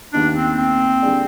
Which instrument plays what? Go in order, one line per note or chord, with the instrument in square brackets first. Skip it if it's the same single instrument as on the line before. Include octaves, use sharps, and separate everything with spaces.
[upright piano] D#2 D#3 B3 D#4 [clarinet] D4
[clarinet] C4
C4
[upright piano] D3 G3 D4 G#4 D5